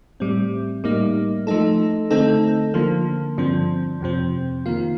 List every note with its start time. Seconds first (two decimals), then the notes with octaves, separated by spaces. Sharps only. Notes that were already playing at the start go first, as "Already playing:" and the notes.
0.20 A2 G3 C4
0.84 A2 G3 A#3 D#4
1.47 F3 A3 D#4 A4
2.11 D3 A3 C4 D#4 A4
2.74 D3 F3 A#3
3.37 G2 D3 F3 C4
4.01 F2 C3 F3 C4
4.66 D#3 A#3 F4